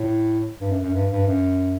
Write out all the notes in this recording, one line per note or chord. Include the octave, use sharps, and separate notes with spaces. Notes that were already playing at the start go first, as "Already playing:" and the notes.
Already playing: A2
G2
F#2
F#2
G2
G2
F#2